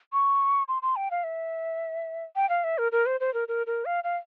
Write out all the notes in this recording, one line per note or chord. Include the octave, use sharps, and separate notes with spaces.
C#6
C6
C6
G5
F5
E5
G5
F5
E5
A#4
A#4
C5
C5
A#4
A#4
A#4
F5
F5